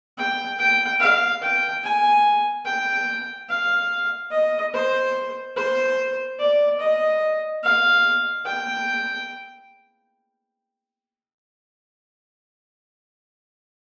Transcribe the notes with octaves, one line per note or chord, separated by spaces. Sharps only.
G5
G5
F5
G5
G#5
G5
F5
D#5
C5
C5
D5
D#5
F5
G5